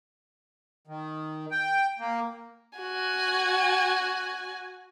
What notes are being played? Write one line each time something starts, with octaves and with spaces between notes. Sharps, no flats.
D#3
G5
A#3
F#4 G#5